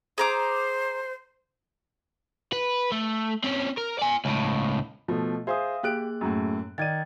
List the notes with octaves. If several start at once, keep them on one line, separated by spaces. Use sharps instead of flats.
G#4 C5 A#5 D6
B4
A3
C4 C#4
A#4
D5 G#5
C#2 A2
B2 F3 A3
G#4 C5 E5 F5 D#6
A#3 G4 G#4 F#6 D7
F#2 A2
D#3 D5 G#6 A6 D#7